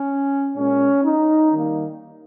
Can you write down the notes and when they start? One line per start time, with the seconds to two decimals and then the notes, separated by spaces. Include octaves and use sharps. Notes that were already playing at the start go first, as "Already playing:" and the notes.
Already playing: C#4
0.56 A#2 G#3 C#4
1.04 D#4
1.52 D#3 G3 A#3